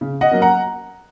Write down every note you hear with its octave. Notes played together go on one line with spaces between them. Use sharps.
C#3
D#5 F#5
F#3 A#3 C#4
F#5 A#5